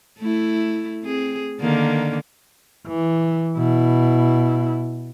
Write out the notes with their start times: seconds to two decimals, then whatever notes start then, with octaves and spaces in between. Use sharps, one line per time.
0.19 A3 E4
1.03 C4 G#4
1.61 D3 D#3 A#3
2.87 E3
3.58 B2 E4